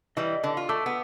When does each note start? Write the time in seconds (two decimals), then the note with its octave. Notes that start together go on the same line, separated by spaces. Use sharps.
0.17 E3 G3 D#5
0.44 D3
0.57 F4
0.69 A3 D6 E6
0.86 B3